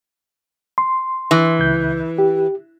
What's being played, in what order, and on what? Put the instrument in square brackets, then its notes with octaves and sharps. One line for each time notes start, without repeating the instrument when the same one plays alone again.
[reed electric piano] C6
[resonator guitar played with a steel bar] E3
[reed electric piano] C#2 G6
G4